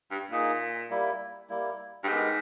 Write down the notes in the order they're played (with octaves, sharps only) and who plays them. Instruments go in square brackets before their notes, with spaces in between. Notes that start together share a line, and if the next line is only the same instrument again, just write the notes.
[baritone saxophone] G2
[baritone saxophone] A#2 [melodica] A#3 D#4 G#4
[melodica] G3 A#3 E4
G3 A#3 E4
[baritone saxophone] G2
[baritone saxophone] G#2 [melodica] G#3 B3 G4 A#4